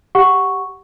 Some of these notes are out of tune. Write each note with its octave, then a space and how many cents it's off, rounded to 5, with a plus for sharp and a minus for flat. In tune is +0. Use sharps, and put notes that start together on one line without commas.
G4 +0 F#5 +0 C#6 +0